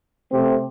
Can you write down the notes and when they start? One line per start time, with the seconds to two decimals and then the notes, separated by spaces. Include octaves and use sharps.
0.30 C3 A3 C4 G4 C5